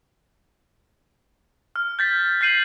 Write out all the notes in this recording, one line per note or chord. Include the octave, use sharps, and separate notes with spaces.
F6
G6 A6 B6
G6 B6 C7 D#7 F#7